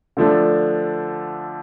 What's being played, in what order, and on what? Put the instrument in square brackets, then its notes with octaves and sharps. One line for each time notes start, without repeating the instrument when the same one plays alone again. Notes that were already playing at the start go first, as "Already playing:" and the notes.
[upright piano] D3 F3 A3 D4